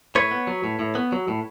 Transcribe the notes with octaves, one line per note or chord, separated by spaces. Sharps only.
A2 B4 C#5
B3
F#3
A2
A2
B3
F#3
A2